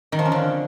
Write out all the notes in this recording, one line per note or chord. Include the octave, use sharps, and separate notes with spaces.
D#3
F3
C#4
D3